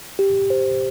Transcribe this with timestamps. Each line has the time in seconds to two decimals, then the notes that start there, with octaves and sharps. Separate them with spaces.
0.19 G4
0.50 C5